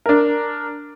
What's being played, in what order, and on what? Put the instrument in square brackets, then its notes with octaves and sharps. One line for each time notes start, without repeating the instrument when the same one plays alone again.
[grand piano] D4 A#4